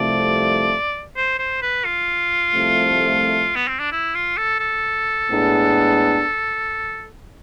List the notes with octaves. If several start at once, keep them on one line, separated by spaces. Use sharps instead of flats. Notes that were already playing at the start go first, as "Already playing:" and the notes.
Already playing: C2 C3 F3 A3 D5
C5
C5
B4
F4
C2 C3 F3 A3
B3
C4
D4
E4
F4
A4
A4
A2 G#3 B3 D4 G#4